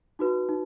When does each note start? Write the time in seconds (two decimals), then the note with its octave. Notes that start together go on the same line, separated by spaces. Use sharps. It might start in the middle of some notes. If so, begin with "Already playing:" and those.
0.19 D#4 F#4 B4
0.49 D#4